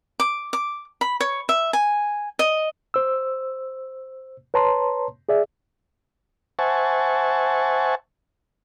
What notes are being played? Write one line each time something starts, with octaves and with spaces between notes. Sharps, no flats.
D6
D6
B5
C#5
E5
G#5
D#5
C5 E6
B4 C#5 A5 A#5 C6
G#4 D5 E5
C5 E5 F#5 G#5 A5 C#6